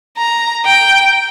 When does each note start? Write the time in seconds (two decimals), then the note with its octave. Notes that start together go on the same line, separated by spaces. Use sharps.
0.18 A#5
0.65 G5